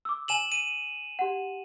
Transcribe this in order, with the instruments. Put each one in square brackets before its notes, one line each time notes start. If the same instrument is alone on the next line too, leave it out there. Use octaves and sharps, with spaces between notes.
[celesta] D6 E6
[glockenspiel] G#5 E7 F#7
D#7
[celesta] G4 F#5